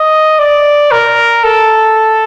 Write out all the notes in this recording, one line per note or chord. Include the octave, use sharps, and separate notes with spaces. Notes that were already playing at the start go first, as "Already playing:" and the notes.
Already playing: D#5
D5
A#4
A4